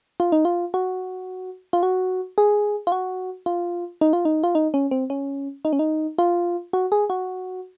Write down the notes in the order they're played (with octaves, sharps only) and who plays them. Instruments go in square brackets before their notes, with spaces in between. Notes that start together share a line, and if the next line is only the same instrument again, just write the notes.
[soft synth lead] F4
D#4
F4
F#4
F4
F#4
G#4
F4
F#4
F4
D#4
F4
D#4
F4
D#4
C#4
C4
C#4
D#4
C#4
D#4
F4
F#4
G#4
F#4